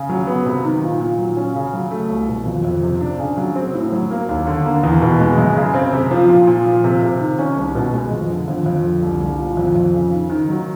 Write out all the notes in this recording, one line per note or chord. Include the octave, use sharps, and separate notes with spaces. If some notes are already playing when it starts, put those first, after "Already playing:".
Already playing: C#3
F#3
B3
C3
D#3
A#2
A#2
F#3
C#4
C#3
F#3
A3
C2
B2
F2
F2
C3
D4
C#3
F#3
C4
A2
F#3
A#3
D#2
D3
A#3
E2
B2
G#3
F#2
C#3
C4
C3
F3
A#2
A#2
F3
C3
C3
D#3
C#4
C2
B2
G#3
F2
D3
F2
F2
D3
C2
C2
A#2
F2
F2
C#3
D#3
D#3
F#3